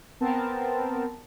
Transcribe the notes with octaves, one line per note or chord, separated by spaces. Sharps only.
B3 C4 A#4 A5